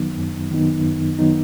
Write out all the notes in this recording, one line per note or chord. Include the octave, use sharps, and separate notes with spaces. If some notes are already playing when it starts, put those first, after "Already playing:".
Already playing: F#2 D#3 F#3 B3 D#4
F#2
D#3 F#3 B3 D#4
F#2
D#3 F#3 B3 D#4